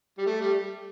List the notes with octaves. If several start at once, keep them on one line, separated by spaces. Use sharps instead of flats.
G3
A3
G3